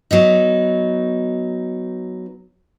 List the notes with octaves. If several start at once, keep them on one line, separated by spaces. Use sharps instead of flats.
F#3 B3 D#4